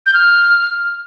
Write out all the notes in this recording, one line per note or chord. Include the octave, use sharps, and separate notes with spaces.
G6
F6